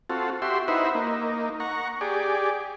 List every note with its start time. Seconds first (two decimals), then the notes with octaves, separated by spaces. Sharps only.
0.10 C4 F4 F#4 A4
0.42 F#4 G4 E5 C6
0.68 D#4 E4 B4 C5 E5 F#5
0.95 A#3 D#4
1.60 F#5 A#5 C#6
2.01 G4 G#4 D5